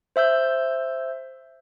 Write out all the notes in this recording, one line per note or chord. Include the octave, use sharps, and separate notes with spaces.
C5 E5 E6 G6